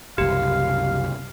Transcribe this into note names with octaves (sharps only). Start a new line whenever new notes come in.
F#1 C2 G4 F5